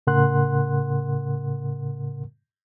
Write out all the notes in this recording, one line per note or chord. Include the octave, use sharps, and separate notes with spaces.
A2 C#3 A#4 F#5 C6 F#6